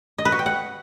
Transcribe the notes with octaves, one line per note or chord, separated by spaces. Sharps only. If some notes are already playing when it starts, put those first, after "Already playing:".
D#5
B4
F#4
G5
F#5